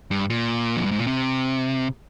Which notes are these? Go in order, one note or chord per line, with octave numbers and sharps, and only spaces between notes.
G2
A#2
F2
G2
G#2
A#2
C3